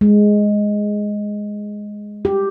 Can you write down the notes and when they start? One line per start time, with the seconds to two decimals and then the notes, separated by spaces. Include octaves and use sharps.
0.01 G#3
2.25 G4